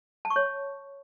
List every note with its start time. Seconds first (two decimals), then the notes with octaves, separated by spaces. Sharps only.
0.25 A5
0.30 C#6
0.36 C#5